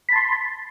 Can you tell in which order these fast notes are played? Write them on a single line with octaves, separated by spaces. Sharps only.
B5 A5 C6